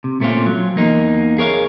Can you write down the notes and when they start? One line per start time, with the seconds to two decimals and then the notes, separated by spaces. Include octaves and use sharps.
0.04 C3
0.20 A#2 A3 C4 C#4 F4
0.46 F#3
0.76 E2 A#3 D#4
1.38 G#4 A#4 C#5 D#5 F5